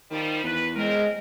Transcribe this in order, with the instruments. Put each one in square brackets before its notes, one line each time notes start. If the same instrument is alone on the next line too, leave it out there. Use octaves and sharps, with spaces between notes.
[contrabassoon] D#3 [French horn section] F3 G3
[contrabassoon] E2 [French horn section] B4
[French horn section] C#3 C4 A#4 [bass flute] G#3